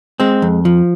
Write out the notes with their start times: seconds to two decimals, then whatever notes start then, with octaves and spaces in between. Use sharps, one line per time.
0.20 G#3 C4
0.42 F2
0.65 F3